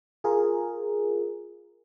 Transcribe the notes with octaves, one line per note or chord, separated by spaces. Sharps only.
F4 G#4 A#4